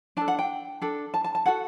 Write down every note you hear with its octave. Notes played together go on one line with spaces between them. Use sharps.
D4 A4 A5
F#5
G5
D4 A4
A5
A5
A5
F#4 A4 F#5